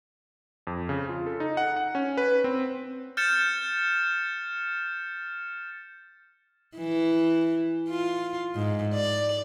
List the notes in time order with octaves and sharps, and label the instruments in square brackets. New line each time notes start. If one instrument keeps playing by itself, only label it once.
[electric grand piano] F2
C#3
F4
A4
D#4
F#5
F#5
C#4
B4
C4
[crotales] F6 G6 A6 C#7 E7
[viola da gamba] E3
F4
G#2
D5